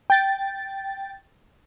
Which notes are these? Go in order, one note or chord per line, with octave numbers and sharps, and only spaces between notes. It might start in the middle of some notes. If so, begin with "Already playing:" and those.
G5 A6